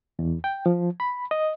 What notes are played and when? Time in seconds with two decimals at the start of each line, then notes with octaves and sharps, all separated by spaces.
0.19 E2
0.44 G5
0.66 F3
1.00 B5
1.31 D#5